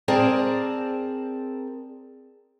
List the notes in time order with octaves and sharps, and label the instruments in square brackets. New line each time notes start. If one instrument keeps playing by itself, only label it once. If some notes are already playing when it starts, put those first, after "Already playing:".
[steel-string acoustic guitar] C4 G#4 A#4 D5 A5